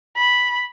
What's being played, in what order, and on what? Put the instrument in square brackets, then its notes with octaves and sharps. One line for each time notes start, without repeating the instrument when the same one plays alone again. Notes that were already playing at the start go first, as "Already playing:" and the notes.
[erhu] B5